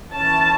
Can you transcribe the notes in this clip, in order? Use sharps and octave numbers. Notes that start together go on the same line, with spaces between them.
E3 C#4 A5